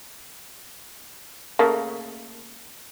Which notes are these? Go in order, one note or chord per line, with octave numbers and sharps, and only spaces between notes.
C#3 A3 A#3